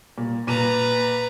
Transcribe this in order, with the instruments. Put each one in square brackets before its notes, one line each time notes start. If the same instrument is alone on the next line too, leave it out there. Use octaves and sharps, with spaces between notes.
[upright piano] A#2
[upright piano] A#2 D#7 [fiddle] B4 A#5